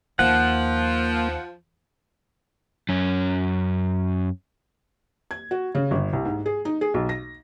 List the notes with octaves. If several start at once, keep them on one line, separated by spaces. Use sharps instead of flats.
D#2 F3 A#3 F#5
F#2 C#4
G#6
F#4
C#3
G1
C2
G#2
G#4
D#4
G#4
B1
A#6